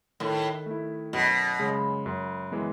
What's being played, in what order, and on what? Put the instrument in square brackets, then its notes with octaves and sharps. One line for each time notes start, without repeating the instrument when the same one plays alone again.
[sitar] A2 [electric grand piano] D#3
[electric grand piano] A3 E4
[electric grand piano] F#2 [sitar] B2
[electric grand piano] C#3 G#3
F#2
E3 G#3 B3